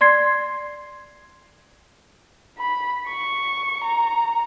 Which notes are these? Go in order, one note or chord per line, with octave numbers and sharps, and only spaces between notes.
D5 C6 G#6 C7
B5
C#6
A#5